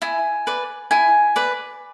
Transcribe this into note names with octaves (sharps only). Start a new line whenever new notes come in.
E4 G#5
B4 D5
E4 G#5
B4 D5